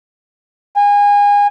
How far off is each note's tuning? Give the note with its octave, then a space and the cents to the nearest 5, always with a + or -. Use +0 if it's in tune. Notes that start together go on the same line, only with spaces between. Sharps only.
G#5 -30